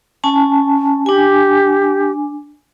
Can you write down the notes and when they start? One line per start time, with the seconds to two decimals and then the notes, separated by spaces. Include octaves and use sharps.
0.24 C#4 G#5 A5
1.06 D4 G4 G#5